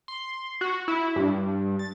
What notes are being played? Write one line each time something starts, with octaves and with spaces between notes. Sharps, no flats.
C6
F#4
E4
G2
A6